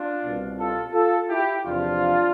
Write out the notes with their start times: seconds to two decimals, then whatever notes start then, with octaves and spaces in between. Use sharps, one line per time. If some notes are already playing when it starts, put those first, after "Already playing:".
Already playing: D4 F4
0.23 C2 B2
0.58 F4 A4
0.93 F4 A4
1.29 E4 G4
1.65 E2 C3 F3 D4 F4